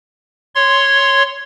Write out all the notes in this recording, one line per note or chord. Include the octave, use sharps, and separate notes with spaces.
C#5 C6